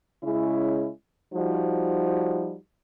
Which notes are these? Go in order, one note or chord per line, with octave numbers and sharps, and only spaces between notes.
C#3 G#3 C#4 E4
F3 G3 D#4 F#4 C5